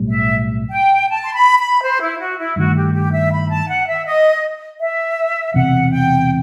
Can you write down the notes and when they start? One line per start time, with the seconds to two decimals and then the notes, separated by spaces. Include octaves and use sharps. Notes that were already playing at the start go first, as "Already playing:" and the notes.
Already playing: B1 A2 G3
0.09 E5
0.71 G5
1.08 A5
1.25 C6
1.32 B5
1.57 B5
1.82 C5
2.01 E4
2.19 F#4
2.38 E4
2.56 G2 D#3 A3 F#4
2.75 G4
2.93 G4
3.12 E5
3.31 B5
3.50 A5
3.68 F#5
3.87 E5
4.05 D#5
4.80 E5
5.54 E1 E2 C3 F#5
5.91 G5